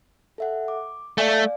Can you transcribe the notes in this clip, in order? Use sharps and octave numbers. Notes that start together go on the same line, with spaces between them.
A4 E5 F#5
D6
A3 D5 F5 G#5